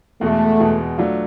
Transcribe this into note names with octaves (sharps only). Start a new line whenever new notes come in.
E2 B2 G#3 A3
E2 B2 G#3
F#3 A3 D4 F4